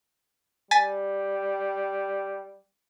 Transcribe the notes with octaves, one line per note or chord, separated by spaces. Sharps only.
G3 G#5 A6 B6